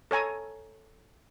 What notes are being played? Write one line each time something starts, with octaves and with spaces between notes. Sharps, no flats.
A4 C#5 G#5 A#5